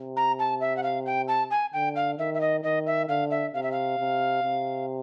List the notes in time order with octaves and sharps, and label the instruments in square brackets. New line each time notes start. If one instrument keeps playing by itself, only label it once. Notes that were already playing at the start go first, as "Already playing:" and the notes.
Already playing: [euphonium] C3
[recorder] A#5
A5
E5
F#5
F5
G5
A5
G#5
[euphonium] D3 [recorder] G5
[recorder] F5
[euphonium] D#3 [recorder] E5
[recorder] E5
D#5
[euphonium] D#3 [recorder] D#5
[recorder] E5
[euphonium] D3 [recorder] F5
[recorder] E5
[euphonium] C3 [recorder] F5
[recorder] E5
F5
[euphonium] C3
C3